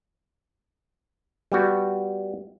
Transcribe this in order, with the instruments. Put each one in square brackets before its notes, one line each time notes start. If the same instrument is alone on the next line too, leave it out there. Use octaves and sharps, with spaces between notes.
[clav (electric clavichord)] G3 B3 F#4